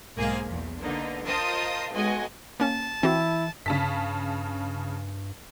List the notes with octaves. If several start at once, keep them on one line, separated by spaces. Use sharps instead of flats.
B1 G#2 A#3 G#4 C5 F5
B1 E2
D3 A#3 B3 D#4
F4 A#4 C5 D#5 A5 D#6
B1 G#3 F#4 D#5 F#5 G#5
A#3 C#4 A5
E3 C4 E4 F#4
G2 C#3 A5 B6